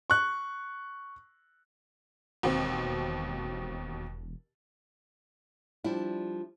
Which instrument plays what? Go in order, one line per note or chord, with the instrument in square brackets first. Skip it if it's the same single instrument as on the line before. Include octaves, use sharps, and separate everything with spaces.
[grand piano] C#6 F#6
[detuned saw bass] E1 [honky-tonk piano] D#2 B2 C4
[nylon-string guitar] F3 G3 D4 E4